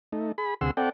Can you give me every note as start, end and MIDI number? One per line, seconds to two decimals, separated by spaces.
0.12 0.32 57
0.12 0.32 63
0.38 0.54 68
0.38 0.54 83
0.61 0.71 38
0.61 0.71 48
0.61 0.71 68
0.61 0.71 78
0.61 0.71 84
0.61 0.71 88
0.77 0.89 60
0.77 0.89 69
0.77 0.89 74
0.77 0.89 78
0.77 0.89 79